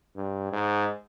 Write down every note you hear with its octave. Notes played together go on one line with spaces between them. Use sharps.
G2
G#2